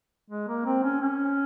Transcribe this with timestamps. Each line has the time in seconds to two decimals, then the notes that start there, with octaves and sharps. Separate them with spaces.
0.30 G#3
0.48 A#3
0.65 C4
0.83 C#4
1.01 C#4